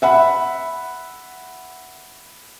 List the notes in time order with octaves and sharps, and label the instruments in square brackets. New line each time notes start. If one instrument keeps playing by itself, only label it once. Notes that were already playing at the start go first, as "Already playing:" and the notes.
[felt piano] E5 F#5 B5